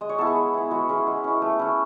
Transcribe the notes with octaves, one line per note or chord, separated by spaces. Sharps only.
G#3 D#5
C#5
B3 E4 A4
G#4
G#3
B3 E4
G#3 F#4
C#4 E4 G#4
G#3
C#4 E4
A3
C#4 E4